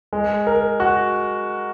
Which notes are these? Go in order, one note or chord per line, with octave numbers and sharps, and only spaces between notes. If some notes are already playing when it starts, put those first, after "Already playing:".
G#3
A#4
F#4